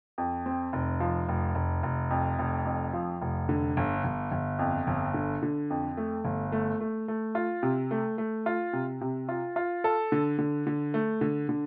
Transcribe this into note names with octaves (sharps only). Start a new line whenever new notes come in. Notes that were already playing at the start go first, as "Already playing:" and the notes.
F2
C4
F1
F3
F1
F1
F1
F2
F1
F2
F3
F1
D3
G1
G1
G1
F2
G1
D3
D3
F2
A3
G1
A3
A3
A3
F4
C3
A3
A3
F4
C3
C3
F4
F4
A4
D3
D3
D3
A3
D3
D3